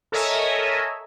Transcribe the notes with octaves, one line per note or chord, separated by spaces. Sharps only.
A4 A#4 C#5 D#5 E5 G#5